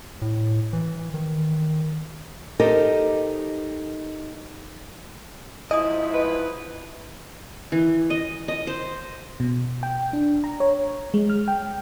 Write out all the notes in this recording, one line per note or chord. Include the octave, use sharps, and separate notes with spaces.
A2
E3
D#3
D#4 G4 A4 A#4 C5 D#5
G#2 F3 E4 D#5 G#5 D#6
B4
E3
D#5
D#5
C5
B2
G5
D4
A#5
C#5
G#3
F6
G5